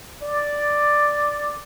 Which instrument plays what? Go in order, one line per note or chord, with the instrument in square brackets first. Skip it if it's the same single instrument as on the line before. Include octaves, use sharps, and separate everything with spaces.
[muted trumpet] D5